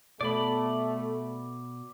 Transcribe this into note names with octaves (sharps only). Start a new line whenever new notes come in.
B2 A3 D5 B5